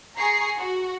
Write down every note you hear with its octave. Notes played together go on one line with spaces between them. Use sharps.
G#4 A#5 C#6 C7
F#4